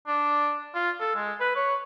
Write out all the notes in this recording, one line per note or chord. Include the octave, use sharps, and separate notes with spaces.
D4
F4
A4
G#3
B4
C#5